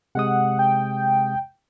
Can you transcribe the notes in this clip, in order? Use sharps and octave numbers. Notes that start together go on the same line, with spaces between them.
C3 G#3 F#5 D#6
G5